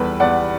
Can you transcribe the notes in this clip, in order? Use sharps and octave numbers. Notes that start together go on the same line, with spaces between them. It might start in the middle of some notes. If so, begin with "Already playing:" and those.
Already playing: E2 G3 A4 B4
E2 D5 F#5